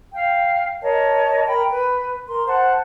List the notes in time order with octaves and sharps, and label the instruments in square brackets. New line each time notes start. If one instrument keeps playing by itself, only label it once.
[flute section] F5 G5
A#4 C#5 D#5 A5
A#4 G5 B5
B4
A#4 C6
C5 F#5 A5